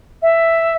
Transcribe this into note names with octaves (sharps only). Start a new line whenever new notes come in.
E5